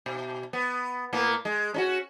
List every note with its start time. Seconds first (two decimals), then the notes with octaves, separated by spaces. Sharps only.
0.06 B2
0.53 B3
1.13 A2 A#3 B3
1.45 G#3
1.74 C#4 D4 F#4